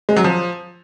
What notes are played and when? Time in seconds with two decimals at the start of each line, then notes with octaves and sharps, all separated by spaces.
0.09 G#3
0.17 F#3
0.24 F3